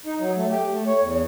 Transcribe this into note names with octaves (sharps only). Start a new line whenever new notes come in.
D#4
F#3
A3
G4
A3
C#5
E2